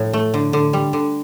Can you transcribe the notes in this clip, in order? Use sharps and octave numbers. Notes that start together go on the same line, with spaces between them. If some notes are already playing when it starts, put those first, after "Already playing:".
Already playing: A2 F3
A3
D3
D3
G3
D3